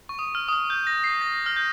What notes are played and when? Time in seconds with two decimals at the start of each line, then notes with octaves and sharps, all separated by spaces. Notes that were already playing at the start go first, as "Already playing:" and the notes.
0.09 C#6
0.19 D#6
0.35 F6
0.48 D#6
0.53 F6
0.70 G6
0.87 A#6
1.04 C7
1.21 A#6
1.46 F6
1.56 G6